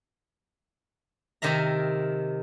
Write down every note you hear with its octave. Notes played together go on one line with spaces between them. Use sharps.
C3 D#3 A#4 E5 A#5